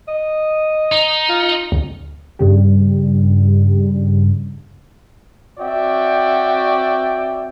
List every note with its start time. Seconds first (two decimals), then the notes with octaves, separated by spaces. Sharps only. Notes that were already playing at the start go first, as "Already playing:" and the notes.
0.08 D#5
0.92 D#4
1.29 F4
1.72 D2
2.39 G2 C#3 G3
5.59 C4 F#4 C#5 D5 E5 G5